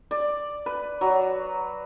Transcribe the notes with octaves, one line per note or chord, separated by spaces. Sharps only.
D5
B4
F#3